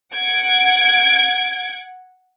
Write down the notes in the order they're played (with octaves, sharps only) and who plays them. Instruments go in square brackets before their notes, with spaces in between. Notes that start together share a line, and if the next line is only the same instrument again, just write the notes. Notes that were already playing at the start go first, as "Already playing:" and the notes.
[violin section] F#5 G#6 D7